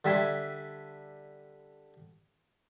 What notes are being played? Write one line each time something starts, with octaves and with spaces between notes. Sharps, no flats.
D3 G3 E5 G#5 C6